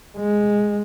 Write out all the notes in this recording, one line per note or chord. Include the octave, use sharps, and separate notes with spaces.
G#3